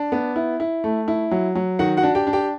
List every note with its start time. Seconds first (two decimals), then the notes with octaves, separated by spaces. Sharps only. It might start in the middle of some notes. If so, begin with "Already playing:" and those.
Already playing: D4
0.12 B3
0.36 E4
0.60 E4
0.84 A3
1.08 E4
1.31 F#3
1.55 F#3
1.79 D#3 F#4 F#5
1.97 F#4 F#5
2.03 D4
2.15 G4 G5
2.27 D4
2.33 G4 G5